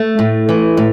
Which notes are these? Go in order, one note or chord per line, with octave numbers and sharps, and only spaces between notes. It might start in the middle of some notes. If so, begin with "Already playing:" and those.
Already playing: A3
A2
E3
A2